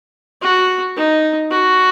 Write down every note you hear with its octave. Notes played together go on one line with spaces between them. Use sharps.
F#4
D#4
F#4